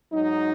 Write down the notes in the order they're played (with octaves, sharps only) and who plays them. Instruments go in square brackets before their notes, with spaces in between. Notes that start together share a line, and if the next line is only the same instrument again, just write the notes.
[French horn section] G#2 F#3 D#4